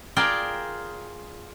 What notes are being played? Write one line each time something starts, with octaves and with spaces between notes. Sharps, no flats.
F4 G#4 A#4 D5 G5 A5